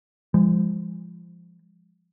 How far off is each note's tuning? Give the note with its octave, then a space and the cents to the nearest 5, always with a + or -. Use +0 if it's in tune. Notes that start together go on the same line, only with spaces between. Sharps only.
F3 -20 G#3 -30